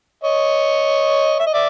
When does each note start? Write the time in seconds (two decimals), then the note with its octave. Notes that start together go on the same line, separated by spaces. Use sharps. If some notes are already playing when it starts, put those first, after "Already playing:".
0.24 C#5 D#5
1.40 E5
1.47 D#5
1.54 D5 E5